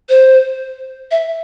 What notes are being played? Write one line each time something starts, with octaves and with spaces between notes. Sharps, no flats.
C5
E5